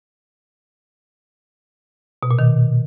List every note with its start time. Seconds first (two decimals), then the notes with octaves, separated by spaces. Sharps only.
2.23 B2
2.31 A#2
2.39 D#3